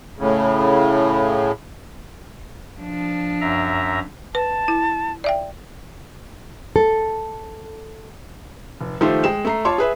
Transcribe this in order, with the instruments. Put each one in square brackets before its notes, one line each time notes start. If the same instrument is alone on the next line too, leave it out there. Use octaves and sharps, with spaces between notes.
[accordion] A2 C#3
[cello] F3 D4
[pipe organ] F#2 E5 A#5
[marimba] B4 [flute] A5
[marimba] E4
D5 E5 G5
[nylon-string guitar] A4
[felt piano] F1
D#3 F3 A3 G4 A4 C5
G#3 G5 E7
A3 A#5 C7
F4 C#5 A5 C6 D6
G#4 B4 E5